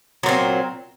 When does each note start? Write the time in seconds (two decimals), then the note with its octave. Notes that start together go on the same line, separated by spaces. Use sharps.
0.23 F#3
0.26 A#2
0.29 C4